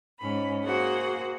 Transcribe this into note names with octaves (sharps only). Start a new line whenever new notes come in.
G#2 C#4 B5
A#3 F#4 G#4 C5 F#5